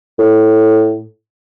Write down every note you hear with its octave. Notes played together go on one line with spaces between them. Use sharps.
A2